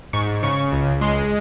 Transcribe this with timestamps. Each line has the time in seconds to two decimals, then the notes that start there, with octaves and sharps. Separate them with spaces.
0.13 G#2 C#6
0.43 C#3 C#6
0.73 C#2
1.01 G#3 C6